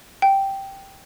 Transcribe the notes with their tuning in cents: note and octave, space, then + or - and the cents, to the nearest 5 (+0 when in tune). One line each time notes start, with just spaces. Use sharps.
G5 -5